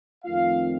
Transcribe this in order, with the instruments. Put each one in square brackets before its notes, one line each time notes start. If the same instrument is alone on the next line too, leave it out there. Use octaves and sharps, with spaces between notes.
[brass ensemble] F2 D#3 A3 C4 F4 F5